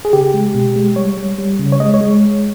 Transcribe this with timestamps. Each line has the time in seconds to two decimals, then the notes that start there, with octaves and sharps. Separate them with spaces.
0.05 G#4
0.13 C#3 G4
0.34 G#3
0.55 B2
0.76 G#3
0.96 G3 C#5
1.17 G3
1.39 G3
1.59 C#3
1.72 C#5
1.80 G#3 D#5
1.94 C#5
2.01 G#3